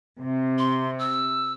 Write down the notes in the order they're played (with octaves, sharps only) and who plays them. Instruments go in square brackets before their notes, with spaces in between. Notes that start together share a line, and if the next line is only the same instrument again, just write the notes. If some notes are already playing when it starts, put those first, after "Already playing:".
[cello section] C3
[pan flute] C6
E6